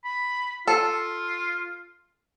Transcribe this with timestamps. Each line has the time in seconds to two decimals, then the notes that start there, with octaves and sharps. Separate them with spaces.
0.04 B5
0.68 F4 A4